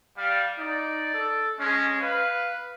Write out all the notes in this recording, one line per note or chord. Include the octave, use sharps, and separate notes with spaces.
G3 F5
D#4 D5
A4
G#3 C#4
B4 F5